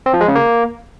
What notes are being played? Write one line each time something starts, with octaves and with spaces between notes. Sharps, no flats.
C4
F3
G#3
C#3
A#3